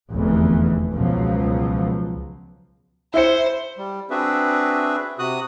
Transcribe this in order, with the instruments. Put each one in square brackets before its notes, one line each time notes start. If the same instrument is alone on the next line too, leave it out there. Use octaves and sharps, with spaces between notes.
[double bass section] F1 E2 D3 E3
C#2 B2 F3 F#3
[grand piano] E4 E5 C#7 [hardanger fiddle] C5
[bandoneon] G3
C4 D4 F#4 G#4 B4 E5
C3 F#4 D#6 F#6